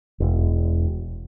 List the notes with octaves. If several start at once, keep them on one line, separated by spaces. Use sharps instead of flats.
E1